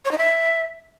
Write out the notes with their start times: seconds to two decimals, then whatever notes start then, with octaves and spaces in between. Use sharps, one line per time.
0.05 C#5
0.11 D#4
0.18 E5